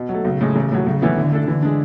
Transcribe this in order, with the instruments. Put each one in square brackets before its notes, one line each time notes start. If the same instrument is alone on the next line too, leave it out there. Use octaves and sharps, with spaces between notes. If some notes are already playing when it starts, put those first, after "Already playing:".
Already playing: [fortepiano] B2
F#3
A3
[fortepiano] B1 [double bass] C#3
[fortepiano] A2 G#3
A1
A2 F#3
[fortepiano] B1 [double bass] C#3
[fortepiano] A2 E3 B3 E4
[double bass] D3 [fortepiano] E3
[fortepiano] A3 D4 A4
[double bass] D3 [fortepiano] E3
[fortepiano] G#3 D4